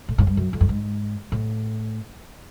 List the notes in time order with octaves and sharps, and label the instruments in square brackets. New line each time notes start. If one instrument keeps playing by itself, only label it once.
[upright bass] A2
G#2
G2
F#2
F2
G2
G#2
A2